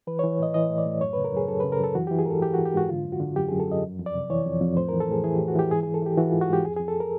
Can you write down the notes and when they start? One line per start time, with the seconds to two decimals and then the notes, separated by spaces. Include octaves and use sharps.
0.07 E3 B4
0.19 E3 C#5
0.39 A2 D#5
0.54 E3 D#5
0.70 A2
0.78 D5
0.86 A2
1.01 F#2 C#5
1.13 C#3 B4
1.25 A#4
1.32 F#2 G#4
1.48 F#2 A4
1.60 C#3 B4
1.72 A#4
1.80 F#2 A4
1.95 E3 F#4
2.07 E3 G4
2.19 G#4
2.26 G#2 A4 A#4
2.42 E3 G4
2.54 E3 F#4
2.65 G4
2.74 G#2 F#4
2.89 D3 F4
3.05 F#2
3.12 F#4
3.20 D3
3.36 F#2 G4
3.48 F#2 G#4
3.60 A4
3.68 F#2 D#5
3.83 F2
3.99 F2
4.06 D5
4.14 C3
4.30 E3 C#5
4.46 F2
4.61 F2
4.77 A2 C5
4.89 E3 A#4
5.01 A4
5.08 A2 G#4
5.24 E3 G#4
5.36 A2 G4
5.48 F#4
5.56 E3 G4
5.71 G#2 G#4
5.83 E3 G#4
5.94 A4
6.02 E3 G4
6.18 E3 F#4
6.29 G#2 F4
6.41 F#4
6.49 G#2 G4
6.65 F2 G#4
6.76 F2 G#4
6.88 A4
7.00 A#4